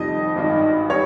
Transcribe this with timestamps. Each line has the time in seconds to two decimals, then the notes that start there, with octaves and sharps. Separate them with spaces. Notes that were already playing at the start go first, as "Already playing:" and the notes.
Already playing: F1 F2 D#3 G3 D#5
0.36 G#1 G2 D#3
0.90 D#3 G3 C#5